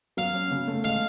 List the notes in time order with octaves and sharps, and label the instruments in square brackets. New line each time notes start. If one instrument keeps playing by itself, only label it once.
[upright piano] F#3 [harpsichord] F5
[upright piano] C#4
C#3
A3
[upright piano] G#3 [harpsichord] F5